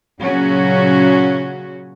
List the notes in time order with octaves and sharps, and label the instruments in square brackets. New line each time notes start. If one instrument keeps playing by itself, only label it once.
[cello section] A#2 C#3 F#3 C#4 F#4